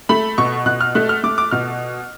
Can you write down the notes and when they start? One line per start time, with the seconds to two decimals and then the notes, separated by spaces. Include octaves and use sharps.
0.09 A3 B5
0.38 B2 C#6
0.66 B2 F#6
0.81 F6
0.95 A3 F#6
1.09 F6
1.24 A3 D6
1.38 D6
1.51 B2 F6